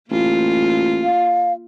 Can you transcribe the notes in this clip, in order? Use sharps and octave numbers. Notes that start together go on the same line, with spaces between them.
A1 A#3 F4
F5